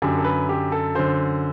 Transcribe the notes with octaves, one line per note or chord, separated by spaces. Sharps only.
F#2 D3 G4
A4
B4
G4
A4
F#2 D3 C5